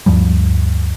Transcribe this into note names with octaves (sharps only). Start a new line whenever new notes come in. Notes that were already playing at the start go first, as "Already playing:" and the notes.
D2 G2 F3 G3